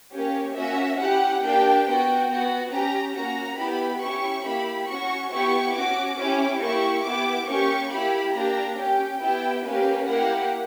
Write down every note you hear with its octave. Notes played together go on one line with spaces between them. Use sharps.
A#3 C#4 G4 C#5
A#3 C#4 F#4 E5
C#4 E4 G4 F#5
A#3 D4 G4 G5
B3 F#4 G5
B3 F#4
C#4 G4 A#5
A#3 C#4 F#4 A#5
B3 E4 G4 B5
C#4 E4 G4 C#6
A#3 E4 G4 B5
C#4 F#4 C#6
B3 E4 G4 C#6
C#4 F#4 D6
C#4 E4 G4 D6
A#3 E4 G4 C#6
B3 E4 G4 D6
A#3 C#4 G4 C#6
A#3 E4 G4 B5
A#3 D4 G4 A#5
C#4 G4 G5
B3 E4 G4 G5
A#3 C#4 G4 B4
A#3 E4 G4 F#5